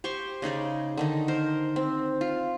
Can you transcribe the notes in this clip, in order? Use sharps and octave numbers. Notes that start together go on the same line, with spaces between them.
G4 C5 C6 C#6
C#3 D#4 G#4 D5
D3 D#3 D#4
A#4 C5
C4
F4